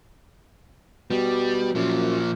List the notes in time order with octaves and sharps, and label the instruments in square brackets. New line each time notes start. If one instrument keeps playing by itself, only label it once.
[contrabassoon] B2 [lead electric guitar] G3
[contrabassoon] F#2 [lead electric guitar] A#2 F3